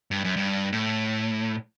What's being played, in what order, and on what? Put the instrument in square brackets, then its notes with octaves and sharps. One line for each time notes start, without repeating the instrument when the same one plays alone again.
[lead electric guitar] G2
F#2
G2
A2